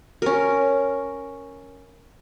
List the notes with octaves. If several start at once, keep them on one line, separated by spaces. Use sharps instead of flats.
C#4 A#4